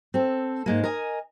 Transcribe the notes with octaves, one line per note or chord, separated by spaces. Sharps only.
C4 A4
G#2 G#3 A#3
A#4 D#5 G#5